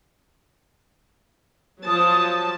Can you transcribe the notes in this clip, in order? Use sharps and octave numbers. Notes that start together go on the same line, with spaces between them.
F3 F#3 A5 D#6